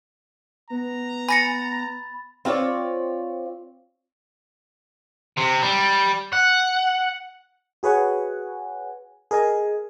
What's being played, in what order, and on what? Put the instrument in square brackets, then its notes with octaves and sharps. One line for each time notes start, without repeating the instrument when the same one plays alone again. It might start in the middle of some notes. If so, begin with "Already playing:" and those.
[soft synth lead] B3 [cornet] A#5
[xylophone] G#5 A#6 C#7 [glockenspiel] B5 A6
[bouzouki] C4 F4 C#5 D5
[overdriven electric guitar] C3
G3
F#5
[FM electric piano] F#4 G#4 B4 C#5 F#5 G#5
G#4 A#4 D#5 G#5